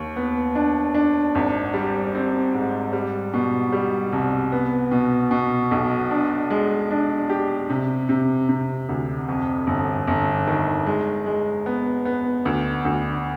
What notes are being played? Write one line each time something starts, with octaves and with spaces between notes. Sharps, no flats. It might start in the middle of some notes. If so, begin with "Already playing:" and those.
Already playing: D#2
B3
D4
D4
G#1
G3
C4
G#2
G3
B2
G3
C2
B3
B2
B2
B1
D4
G#3
D4
G4
C3
C3
C3
D2
F2
G1
G1
D#3
G#3
G#3
B3
B3
D2
D2